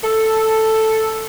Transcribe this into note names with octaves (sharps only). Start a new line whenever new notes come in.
A4